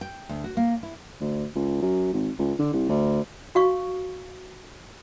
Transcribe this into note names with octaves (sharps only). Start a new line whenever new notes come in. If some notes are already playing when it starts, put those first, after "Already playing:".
G5
D2
F#4
A#3
E4
D2
C#2
F#2
G#1
C#2
D3
C2
D2
F#4 F5 C#6